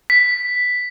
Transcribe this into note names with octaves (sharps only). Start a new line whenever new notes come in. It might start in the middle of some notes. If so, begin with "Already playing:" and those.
B6